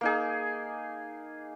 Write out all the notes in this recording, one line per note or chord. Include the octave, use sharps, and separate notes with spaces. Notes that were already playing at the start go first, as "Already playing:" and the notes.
A#3 D#4 G#4